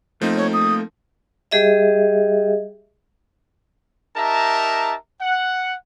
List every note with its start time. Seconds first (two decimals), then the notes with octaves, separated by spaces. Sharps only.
0.21 F3 A3 A#3 C4 D#4
0.37 C#5
0.53 D#6
1.51 G3 G4 G#4 D#5 E5
4.17 D#4 G4 A#4 E5 A5 A#5
5.21 F#5